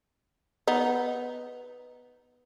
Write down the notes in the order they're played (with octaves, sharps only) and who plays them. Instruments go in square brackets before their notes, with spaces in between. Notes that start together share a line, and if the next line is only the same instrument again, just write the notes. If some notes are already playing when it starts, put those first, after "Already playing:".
[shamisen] B3 D#4